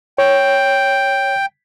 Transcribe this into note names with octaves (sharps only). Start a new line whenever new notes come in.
C#5 G5